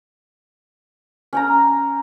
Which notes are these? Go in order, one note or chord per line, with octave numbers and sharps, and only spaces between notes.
C#4 G5 A#5